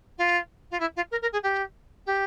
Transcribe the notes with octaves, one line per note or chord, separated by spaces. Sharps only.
F4
F4
E4
F4
A#4
A#4
G#4
G4
G4